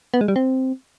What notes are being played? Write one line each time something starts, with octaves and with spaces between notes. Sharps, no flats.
B3
G#3
G3
C4